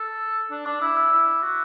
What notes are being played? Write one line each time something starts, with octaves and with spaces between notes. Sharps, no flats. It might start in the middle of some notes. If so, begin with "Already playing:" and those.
Already playing: A4
D4
D4 D6
E4 E6
E6
E4
F#4